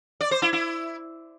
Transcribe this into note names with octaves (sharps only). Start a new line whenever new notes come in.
D5
C5
E4
E4